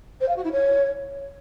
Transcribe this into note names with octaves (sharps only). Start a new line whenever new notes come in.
C5
F5
F#4
E4
C#5